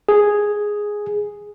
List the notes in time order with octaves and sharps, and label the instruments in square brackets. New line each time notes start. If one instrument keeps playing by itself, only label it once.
[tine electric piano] G#4